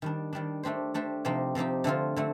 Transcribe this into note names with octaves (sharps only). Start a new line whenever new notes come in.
D#3 G3 D4
D#3 G3 D4
A3 D4 G4 C5
A3 D4 G4 C5
C3 F3 C4 D#4 G4
C3 F3 C4 D#4 G4
D3 A3 C4 F4
D3 A3 C4